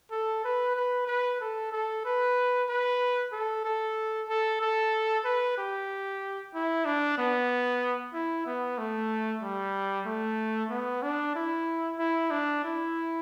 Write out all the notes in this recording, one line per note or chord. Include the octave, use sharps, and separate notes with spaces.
A4
B4
B4
B4
A4
A4
B4
B4
A4
A4
A4
A4
B4
G4
E4
D4
B3
E4
B3
A3
G3
A3
B3
D4
E4
E4
D4
E4